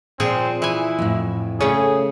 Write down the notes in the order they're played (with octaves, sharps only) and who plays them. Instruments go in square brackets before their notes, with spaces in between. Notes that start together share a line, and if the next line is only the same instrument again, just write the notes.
[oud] A#2 [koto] F3 G#4 [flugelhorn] C4
[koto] E3 G#5 [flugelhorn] E4
[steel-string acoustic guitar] F2 A2
[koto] C#3 [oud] A3 C#4 [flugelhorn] G#4